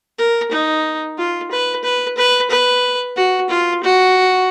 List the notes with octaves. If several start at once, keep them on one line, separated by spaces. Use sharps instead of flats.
A#4
D#4
F4
B4
B4
B4
B4
F#4
F4
F#4